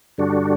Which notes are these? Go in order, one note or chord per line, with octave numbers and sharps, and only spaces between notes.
G2 D3 G3 D4 F#4